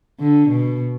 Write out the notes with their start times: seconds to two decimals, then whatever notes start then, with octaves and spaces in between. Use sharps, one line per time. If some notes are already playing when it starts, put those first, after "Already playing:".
0.20 D3
0.49 B2